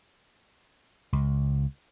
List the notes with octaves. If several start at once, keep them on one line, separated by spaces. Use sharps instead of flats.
C#2